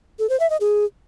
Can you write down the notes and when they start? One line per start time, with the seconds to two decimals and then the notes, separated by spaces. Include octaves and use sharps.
0.19 A4
0.29 C5
0.40 E5
0.50 D#5
0.60 G#4